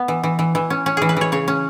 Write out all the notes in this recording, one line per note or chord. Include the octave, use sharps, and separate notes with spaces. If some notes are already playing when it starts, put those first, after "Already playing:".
Already playing: B3
E3
E3
E3
E3
C#4
C#4
E3 G#4
B4
E3 C#5
C#3 C#5
C#4